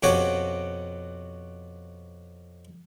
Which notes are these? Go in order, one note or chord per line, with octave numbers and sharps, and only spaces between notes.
F2 B2 C#4 F#4 G4 G#5